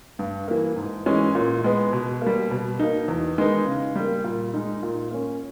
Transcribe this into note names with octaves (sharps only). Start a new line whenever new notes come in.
G2
E3 A#3
G#2
E3 G#3 C#4
A#2
G#3 B3
B2
G3 A#3
B2
A#3 D#4
E2
D#3 G#3 B3 D#4
C#3
G3 A#3
A#2
G#3 D#4
A#2
A#3 C#4